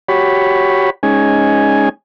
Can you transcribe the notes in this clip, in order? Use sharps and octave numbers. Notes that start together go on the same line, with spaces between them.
F#4 G4 C#5 B5
G#3 C#4 D#4 G#5